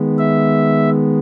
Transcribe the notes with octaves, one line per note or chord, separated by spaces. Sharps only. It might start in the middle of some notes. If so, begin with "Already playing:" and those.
Already playing: D#3 G#3 B3
E5